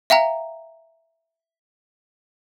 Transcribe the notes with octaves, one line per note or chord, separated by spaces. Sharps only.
E5 F5 G5 A#5